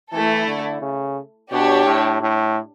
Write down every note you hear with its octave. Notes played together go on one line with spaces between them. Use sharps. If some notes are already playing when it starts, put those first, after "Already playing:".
E3 A3 E4 A4
D3
C#3
B2 D4 G4 C#5
A2
A2